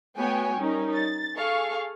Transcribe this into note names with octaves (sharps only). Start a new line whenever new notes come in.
A3 B3 F#4 C#5 G5 G#5
G3 C#4 D#4 A#4
A6
G#4 A4 F5 C#6